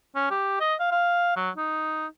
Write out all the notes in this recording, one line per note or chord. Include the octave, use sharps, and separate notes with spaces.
C#4
G4
D#5
F5
F5
F#3
D#4